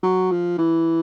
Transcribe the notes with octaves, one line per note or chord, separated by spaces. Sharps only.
F#3
F3
E3